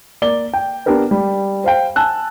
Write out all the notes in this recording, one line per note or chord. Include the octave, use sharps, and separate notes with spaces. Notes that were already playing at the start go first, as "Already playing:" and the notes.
A#3 D5 G7
G5
B3 D4 G4 A#4 B4
G3
C5 F5 G5
G#5 A5 E6 F#6